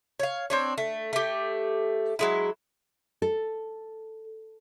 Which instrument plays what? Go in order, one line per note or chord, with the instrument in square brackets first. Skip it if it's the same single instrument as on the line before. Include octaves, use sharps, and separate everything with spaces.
[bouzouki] C#5 F5
C4 D4 C#5
A3
A3 G4
F#3 G#3 E4
[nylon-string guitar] A4